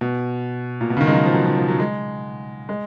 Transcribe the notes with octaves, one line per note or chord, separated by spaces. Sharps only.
B2
A#2
B2
C#3
D#3
G#3
F#3
F3
F#3
F3
F3
F#3
G#3
G#3